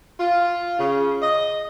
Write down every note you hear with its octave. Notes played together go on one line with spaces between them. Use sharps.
F4
C#3
D#5